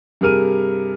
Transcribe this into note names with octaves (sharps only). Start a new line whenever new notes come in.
G2 C3 G#4 A#4 F6 D#7